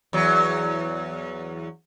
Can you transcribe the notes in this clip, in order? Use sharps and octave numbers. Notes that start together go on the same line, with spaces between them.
E2 F#3